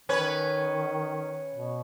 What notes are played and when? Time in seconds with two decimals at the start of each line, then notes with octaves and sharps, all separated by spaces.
0.09 D#3 C#4 B4 C#5
1.54 B2